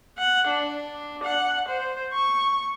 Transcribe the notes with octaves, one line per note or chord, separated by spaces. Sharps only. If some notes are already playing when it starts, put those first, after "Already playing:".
F#5
D4
F#5
C5
C#6